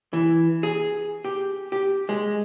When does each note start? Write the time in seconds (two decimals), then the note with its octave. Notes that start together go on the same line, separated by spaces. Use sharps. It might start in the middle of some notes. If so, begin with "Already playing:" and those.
0.13 E3
0.63 G#4
1.25 G4
1.72 G4
2.09 G#3